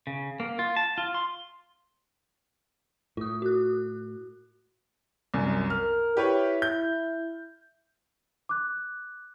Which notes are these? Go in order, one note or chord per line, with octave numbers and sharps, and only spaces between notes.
C#3
A#3
F4
A5
F4
C6
A2 F4 D#6
F#4 F#6
C2 F#2
A#4 F6
E4 G4 B4 C#5
G6
D6 F#6